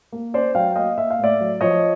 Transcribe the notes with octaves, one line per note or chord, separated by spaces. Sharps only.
A#3
C#4 C5 D5
F#3 F5 G5
A#3 D#5 F5
A#3 E5
F5
A2 D5 E5
F#3
F3 C#5 D#5